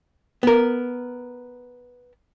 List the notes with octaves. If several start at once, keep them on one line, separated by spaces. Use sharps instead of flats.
B3 A#4